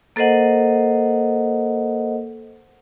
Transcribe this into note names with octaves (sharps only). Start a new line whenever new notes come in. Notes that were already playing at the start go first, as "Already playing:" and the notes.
A#3 A4 A#4 C5 D#5 F#5